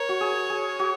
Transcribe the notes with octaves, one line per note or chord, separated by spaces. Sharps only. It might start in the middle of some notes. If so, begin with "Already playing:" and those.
Already playing: A#4 C#5
F#4
G#4
G#4
F#4